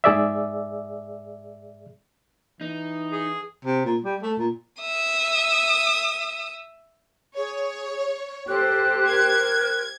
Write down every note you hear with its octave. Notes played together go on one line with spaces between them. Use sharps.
G#2 G#4 D5 E5
E3 D#4
G#4
C3
A#2
G3
A3
A#2
E5 D#6
G#4 C#5
G4 A4 C5 F#6
A#4 G#6